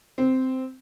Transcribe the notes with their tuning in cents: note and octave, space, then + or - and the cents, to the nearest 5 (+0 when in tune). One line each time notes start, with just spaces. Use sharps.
C4 -10